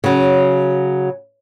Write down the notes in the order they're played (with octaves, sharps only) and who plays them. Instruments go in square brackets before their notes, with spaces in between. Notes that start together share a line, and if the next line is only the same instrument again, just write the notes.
[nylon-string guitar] C#3 F#3